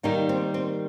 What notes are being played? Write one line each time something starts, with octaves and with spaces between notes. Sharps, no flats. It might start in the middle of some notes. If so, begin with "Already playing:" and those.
D#3 G3 A#3 D#4
C4
C4